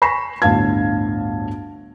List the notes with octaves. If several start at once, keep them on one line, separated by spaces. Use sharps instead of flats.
G#5 B5 C#6 A#6 C7 E7
G1 D2 A2 F5 A5 G#6